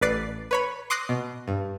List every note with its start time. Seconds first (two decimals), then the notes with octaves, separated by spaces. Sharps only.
0.01 A1 B4 D5 C7
0.51 B4 C#5 B5
0.90 C6 D6 D#6 F#6 A#6 C7
1.09 B2
1.48 G2